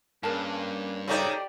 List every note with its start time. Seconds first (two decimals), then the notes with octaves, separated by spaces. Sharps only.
0.23 G2 A#3 C#4 G#4 A#4 A5
1.08 C#3 D#4 F#4 G4 A4 C5 D5